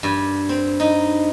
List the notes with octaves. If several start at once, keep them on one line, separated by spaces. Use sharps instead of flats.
G2
C4
D#4